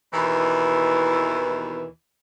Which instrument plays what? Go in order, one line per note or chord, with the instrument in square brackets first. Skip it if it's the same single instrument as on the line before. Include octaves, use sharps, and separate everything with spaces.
[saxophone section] D#2 B2 E3